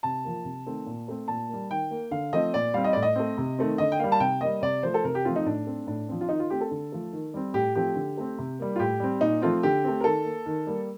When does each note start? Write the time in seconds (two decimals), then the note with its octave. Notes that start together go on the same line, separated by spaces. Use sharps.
0.03 C3 A5
0.24 F3 A#3
0.44 C3
0.66 D#3 A3 C4
0.86 A#2
1.08 A3 C4
1.28 A#2 A5
1.49 G3 A#3
1.70 D#3 G5
1.91 A#3
2.11 D3 F5
2.32 F3 A3 C4 D#5
2.54 A#2 D5
2.74 G3 C4 F5
2.84 D#5
2.93 A2 D5
3.03 D#5
3.16 A3 C4
3.38 C3
3.58 D#3 A3 C4
3.78 D3 D#5
3.92 G5
3.99 G3 A#3 F5
4.12 A5
4.20 C3 G5
4.41 G3 A#3 D#5
4.62 C3 D5
4.83 F3 A3 C5
4.94 A4
5.04 C3 A#4
5.15 G4
5.25 F3 A3 C4 F4
5.36 D#4
5.45 A2 D4
5.66 A3 C4
5.87 A2 D4
6.08 F3 C4
6.21 F4
6.29 D#3 D#4
6.40 F4
6.50 A3 C4 G4
6.61 A4
6.71 D3
6.92 F3 A3
7.13 D#3
7.34 G3 C4
7.54 A2 G4
7.75 F3 A3 C4 G4
7.95 D3
8.18 A3 C4
8.38 C3
8.59 G3 A#3
8.76 F4
8.79 A2 G4
9.00 G3 C4
9.21 A#2 D#4
9.42 F3 A3 C4 F4
9.63 D3 G4
9.84 A3 C4
10.01 A#4
10.04 D#3 A4
10.25 A#3
10.46 D#3
10.67 G3 A#3